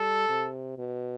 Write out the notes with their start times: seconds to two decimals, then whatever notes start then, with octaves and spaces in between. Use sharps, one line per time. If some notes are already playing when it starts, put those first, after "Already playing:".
Already playing: G3 A4
0.29 C3
0.78 B2